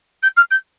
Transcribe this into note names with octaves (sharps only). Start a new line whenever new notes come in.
G6
F6
G6